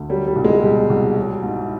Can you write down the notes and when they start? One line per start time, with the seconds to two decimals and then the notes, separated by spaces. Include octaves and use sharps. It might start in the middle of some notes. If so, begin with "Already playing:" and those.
Already playing: D2
0.09 F#3 G3
0.27 G3
0.36 C2
0.44 G#3
0.63 B2 G3
0.90 C2
1.17 F#3
1.43 G#2